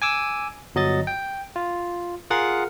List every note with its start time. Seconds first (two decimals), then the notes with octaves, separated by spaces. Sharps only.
0.02 G#5 D6 E6
0.75 G1 F#3 D#5 A6
1.07 G5
1.56 F4
2.30 F4 G#4 A#4 F5 F#5